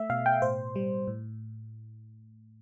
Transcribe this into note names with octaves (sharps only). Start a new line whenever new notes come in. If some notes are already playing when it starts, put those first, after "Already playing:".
Already playing: A3 E5
B2 F5
G5
A2 C5
G3
A2